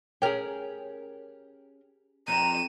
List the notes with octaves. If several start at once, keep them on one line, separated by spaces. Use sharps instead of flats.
C#4 G4 G#4 A#4
F2 A#5 D#7 E7